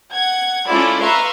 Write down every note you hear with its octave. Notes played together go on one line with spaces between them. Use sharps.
F#5 G#6
G#3 C#4 E4 F4 A4 D5
B4 E5 F5 A#5 C6 C#6